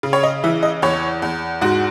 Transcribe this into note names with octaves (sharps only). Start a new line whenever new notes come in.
C#3
C#5
D#5
E3 E5
D#5
E2 C#5
E2
G#2 F#4